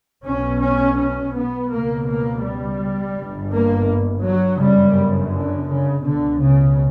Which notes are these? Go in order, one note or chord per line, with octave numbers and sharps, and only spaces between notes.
B1 B2 C#4
C#4
C#4
B3
C#2 B2 A#3
A#3
G3
G1 G2
A#3
F#3
G1 F#2 C#3 G3
D3
C#3
C#2 B2 D3
C#3